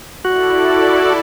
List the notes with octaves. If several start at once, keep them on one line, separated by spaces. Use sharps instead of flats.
E4 F#4 A4 D5